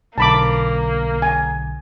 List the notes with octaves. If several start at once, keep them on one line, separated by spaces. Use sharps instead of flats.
B1 D3 A#3 A5 B5 D6
G#5